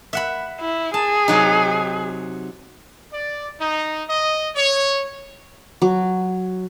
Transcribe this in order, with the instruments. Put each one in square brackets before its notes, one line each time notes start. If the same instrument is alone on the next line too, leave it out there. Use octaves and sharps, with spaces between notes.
[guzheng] E5 F#5 B5
[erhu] E4
[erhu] G#4 [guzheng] A5
[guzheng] C3 F#3 D#4
[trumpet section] D5
D#4
D#5
C#5
[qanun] F#3